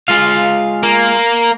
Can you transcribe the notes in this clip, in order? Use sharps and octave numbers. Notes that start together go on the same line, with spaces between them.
G#3 F4 F5
A#3